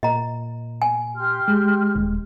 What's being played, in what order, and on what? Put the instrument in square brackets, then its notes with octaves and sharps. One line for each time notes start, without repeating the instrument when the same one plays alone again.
[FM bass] A#2 [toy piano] D#5 A#5
[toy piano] G#5
[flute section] G4 C6 F6
[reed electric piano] G#3
[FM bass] D#1